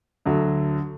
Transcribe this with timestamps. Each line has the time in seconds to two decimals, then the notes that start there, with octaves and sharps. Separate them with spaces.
0.26 D2 D3 F#3